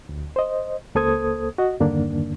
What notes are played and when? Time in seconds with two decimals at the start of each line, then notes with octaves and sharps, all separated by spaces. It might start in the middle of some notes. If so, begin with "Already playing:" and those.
0.09 D2
0.36 C5 D#5
0.95 C#2 A#3 A4 C5 D#6 G#6
1.58 F#4 D#5
1.80 E2 G2 D3 D#3 A#3 D4